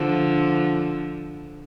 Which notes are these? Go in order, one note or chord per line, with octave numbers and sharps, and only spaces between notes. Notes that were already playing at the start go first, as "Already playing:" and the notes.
Already playing: D3 F3